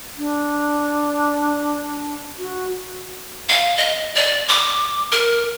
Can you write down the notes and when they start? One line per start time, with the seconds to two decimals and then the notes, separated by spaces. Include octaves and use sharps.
0.18 D4
2.39 F#4
3.49 F5
3.77 D#5
4.15 D5
4.48 D6
5.12 A#4